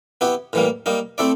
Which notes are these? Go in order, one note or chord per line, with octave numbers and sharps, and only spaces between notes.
B3 E4 G4
A2 E3 G3 A#3
G3 A#3 D#4
A3 C4 E4 A4 D5